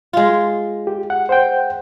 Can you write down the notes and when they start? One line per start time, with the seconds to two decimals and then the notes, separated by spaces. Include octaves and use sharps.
0.13 G#3 F4
0.87 G4
1.10 F#5
1.29 C5 F#5 G5